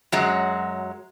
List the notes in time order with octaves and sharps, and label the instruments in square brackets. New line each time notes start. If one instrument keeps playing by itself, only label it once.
[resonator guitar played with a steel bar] F#2 F#3 G#3